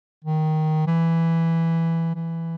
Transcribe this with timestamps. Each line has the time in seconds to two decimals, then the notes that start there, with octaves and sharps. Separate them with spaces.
0.24 D#3
0.87 E3
2.15 E3